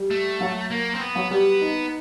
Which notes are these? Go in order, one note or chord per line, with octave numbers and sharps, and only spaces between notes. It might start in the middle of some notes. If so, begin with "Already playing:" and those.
Already playing: G3 G4
A3
F#3 F#4
A#3
C4
B3
F#3 F#4
G3 B3 G4
D#4